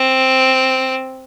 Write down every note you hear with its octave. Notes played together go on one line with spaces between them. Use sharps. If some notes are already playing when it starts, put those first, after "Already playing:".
Already playing: C4